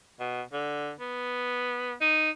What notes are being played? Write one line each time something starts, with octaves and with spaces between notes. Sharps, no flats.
B2
D3
B3
D#4